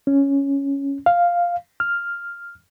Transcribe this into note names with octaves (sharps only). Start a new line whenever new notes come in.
C#4
F5
F6